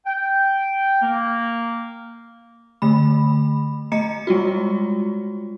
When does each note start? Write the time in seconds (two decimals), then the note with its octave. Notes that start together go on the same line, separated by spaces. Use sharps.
0.06 G5
1.01 A#3
2.82 D3 A3 B5
3.92 A3 D#5 A#5 C#7
4.27 G3 G#3 F4 F#4